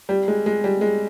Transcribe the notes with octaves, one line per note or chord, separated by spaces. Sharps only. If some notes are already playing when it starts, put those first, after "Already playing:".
G3
G#3
G#3
G3
G#3